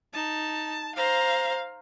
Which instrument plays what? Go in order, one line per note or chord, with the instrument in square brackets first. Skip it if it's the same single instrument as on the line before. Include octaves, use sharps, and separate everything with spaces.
[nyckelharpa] D#4 [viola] A5
[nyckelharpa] C5 A#5 [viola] F5